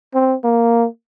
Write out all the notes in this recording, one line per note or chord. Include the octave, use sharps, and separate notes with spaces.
C4
A#3